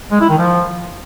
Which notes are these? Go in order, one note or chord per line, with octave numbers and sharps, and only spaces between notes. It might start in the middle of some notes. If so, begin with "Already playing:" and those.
G#3
E4
D#3
F3